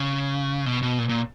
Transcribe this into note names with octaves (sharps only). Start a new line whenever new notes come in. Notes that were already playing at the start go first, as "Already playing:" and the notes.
Already playing: C#3
B2
B2
A#2
A#2